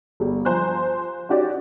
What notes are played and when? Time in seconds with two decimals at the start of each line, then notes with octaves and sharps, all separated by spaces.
0.20 G1 G3
0.45 F3 C5 G#5 A#5 F#6
1.29 C#4 D#4 F#4 G4 D5